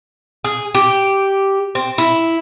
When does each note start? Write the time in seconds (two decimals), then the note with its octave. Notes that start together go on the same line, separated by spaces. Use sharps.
0.44 G#4
0.75 G4
1.75 C4
1.98 E4